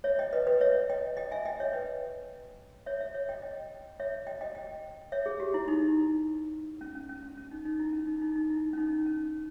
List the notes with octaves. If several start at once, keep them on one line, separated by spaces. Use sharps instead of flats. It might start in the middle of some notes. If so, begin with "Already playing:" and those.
C#5 E5
D#5 G5
B4 D#5
B4 D#5
C#5 E5
D#5 G5
D#5 G5
E5 G#5
D#5 G5
C#5 E5
B4 D#5
C#5 E5
C#5 E5
C#5 E5
D#5 G5
D#5 G5
C#5 E5
D#5 G5
D#5 G5
D#5 G5
C#5 E5
G#4
G4
E4
D#4
C#4
C#4
C#4
C#4
C#4
D#4
D#4
E4
C#4
D#4
D#4
D#4
E4
C#4
D#4
C#4